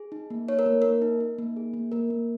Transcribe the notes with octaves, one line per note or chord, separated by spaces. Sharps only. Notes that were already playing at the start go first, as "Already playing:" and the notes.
Already playing: G#4
D#4
A#3
D#4 C#5
A#4
A#3
A#3 A#4
D#4
D#4
A#3
G#4
A#3
A#3 A#4
A#3